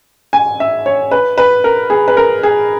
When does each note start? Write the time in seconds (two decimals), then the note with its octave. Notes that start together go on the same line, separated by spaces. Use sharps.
0.33 G#5
0.60 E5
0.86 C#5
1.11 B4
1.38 B4
1.64 A#4
1.90 G#4
2.08 B4
2.17 A#4
2.43 G#4